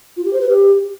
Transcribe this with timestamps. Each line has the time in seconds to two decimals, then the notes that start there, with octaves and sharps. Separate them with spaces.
0.17 F4
0.25 G4
0.33 C5
0.41 B4
0.49 G4